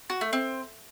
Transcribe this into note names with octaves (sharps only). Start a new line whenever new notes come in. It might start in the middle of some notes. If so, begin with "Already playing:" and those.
F#4
A3
C4